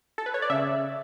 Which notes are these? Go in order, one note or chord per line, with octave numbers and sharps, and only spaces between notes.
A4
B4
C#5
D5
C#3 E5